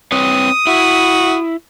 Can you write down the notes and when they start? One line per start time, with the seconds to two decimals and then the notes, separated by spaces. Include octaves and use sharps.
0.12 C4 B4 C#5 D#6
0.67 E4 F#4